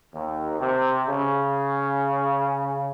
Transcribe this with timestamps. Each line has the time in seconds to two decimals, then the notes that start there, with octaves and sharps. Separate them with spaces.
0.14 D#2
0.60 C3
1.07 C#3